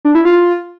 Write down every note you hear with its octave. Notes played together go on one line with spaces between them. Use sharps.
D4
E4
F4